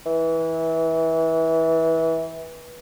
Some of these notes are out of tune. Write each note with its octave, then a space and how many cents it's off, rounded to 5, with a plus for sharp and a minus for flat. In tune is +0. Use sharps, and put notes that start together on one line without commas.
E3 -20